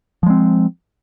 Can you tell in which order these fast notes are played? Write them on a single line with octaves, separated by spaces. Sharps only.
F3 G#3 C4